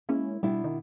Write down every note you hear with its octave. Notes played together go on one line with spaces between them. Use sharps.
G#3 A#3 C#4 E4
B2 G3 D4 E4
D#3